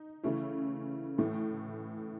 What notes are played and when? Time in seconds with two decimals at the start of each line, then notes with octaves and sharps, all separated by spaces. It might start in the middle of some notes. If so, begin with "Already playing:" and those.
Already playing: D#4
0.23 C#3 E3 A3 C#4 E4
1.18 A2 E3 A3